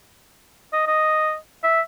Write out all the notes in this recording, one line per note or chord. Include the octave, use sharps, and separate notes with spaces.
D#5
D#5
E5